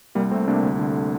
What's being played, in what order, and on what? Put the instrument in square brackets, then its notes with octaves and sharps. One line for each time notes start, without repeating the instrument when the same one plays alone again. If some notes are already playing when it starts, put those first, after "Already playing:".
[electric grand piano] C2 G3 A#3
C3 A3 C4
C2 A#3 D4
D2
D3